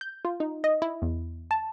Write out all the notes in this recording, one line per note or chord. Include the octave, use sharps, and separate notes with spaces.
G6
F4
D#4
D#5
E4
E2
A5